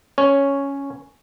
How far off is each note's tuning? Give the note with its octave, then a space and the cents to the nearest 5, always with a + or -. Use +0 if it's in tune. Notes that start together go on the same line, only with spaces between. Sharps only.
C#4 +5 C#5 +0